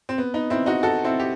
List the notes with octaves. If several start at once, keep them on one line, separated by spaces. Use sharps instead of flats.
C4
B3
B3 D#4
C4 E4
D#4 F#4
F#4 A4
C4 E4
G4